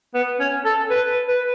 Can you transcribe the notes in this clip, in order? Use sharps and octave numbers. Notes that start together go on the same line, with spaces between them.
B3
C#4
A4
B4
B4